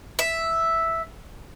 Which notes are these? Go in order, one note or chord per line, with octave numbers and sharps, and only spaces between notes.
E5